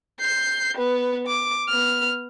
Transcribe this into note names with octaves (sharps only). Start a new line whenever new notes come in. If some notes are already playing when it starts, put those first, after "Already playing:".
G6 C7
B3 B4
D6
B3 F6